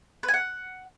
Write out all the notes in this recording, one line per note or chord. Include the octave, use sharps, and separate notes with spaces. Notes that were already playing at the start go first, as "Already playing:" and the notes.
B4
G#5
F#5